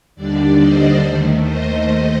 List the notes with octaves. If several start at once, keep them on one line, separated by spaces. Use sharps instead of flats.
D#2 D3 G3 D4 D5
C5 D#5
D#2 D#3 A3
C5 D#5